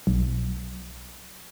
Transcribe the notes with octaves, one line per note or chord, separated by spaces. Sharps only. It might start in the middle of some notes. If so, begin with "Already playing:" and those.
B1